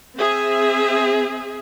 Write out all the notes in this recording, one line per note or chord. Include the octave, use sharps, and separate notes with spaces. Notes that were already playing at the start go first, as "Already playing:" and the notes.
C4 G#4 E5